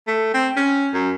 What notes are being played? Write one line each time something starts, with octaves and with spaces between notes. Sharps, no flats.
A3
C4
C#4
F#2